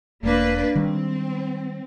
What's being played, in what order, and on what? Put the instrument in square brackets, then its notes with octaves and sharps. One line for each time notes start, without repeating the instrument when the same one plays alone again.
[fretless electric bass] E1 [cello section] A#3 D4 B4
[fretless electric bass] D#3 G3 G#3 [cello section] C4